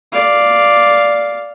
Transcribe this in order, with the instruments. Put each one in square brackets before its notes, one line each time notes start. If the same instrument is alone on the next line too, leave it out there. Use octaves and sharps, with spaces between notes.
[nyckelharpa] D5 F5